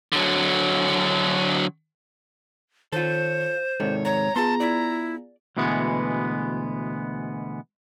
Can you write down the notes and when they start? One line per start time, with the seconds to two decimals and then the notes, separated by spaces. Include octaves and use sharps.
0.13 D3 F#3
2.92 D#3 F4 A4 C5 C#5
3.80 G#2 C3 D#3 A4 C#5 D5
4.05 C#5 A#5
4.36 B3 F4 G#4 A5 C6
4.60 E4 D5
5.57 D2 B2 E3 G#3 B3